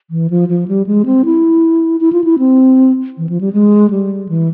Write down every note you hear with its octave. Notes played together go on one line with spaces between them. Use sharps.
E3
F3
F3
G3
G#3
C4
E4
E4
F4
E4
C4
E3
F3
G3
G#3
G3
E3